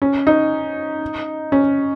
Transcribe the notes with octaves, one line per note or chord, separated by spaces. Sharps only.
C#4
D#4
C#4